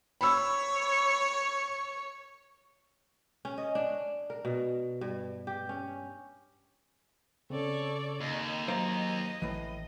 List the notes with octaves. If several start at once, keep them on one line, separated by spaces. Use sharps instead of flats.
C#5 B5 E6
C#4
D#5
D4
A#4
B2
G2
G4
C#4
C#3 C4 A4 C#5 D5
D#2 D#5
F#3 C5 F5 A#5
A1 A2 E3